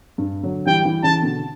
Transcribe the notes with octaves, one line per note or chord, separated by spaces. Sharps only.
G2
D3 F#3
E3 G3 G5
E3 G3
C#3 E3 A5
B2 D3